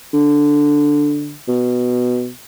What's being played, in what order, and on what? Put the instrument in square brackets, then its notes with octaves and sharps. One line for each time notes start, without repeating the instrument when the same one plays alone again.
[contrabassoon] D3
B2